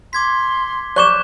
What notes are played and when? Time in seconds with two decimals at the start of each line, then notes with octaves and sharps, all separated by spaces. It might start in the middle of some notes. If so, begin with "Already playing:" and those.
0.13 C6 D6 G#6 B6
0.96 D5 C#6 D6 F#6 G6 E7